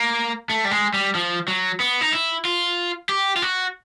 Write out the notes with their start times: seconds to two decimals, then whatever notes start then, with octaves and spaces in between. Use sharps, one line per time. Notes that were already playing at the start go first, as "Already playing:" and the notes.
Already playing: A#3
0.50 A3
0.65 G3
0.71 G#3
0.94 G3
1.15 F3
1.48 F#3
1.80 B3
2.01 D#4
2.13 E4
2.45 F4
3.09 G4
3.36 F4
3.42 F#4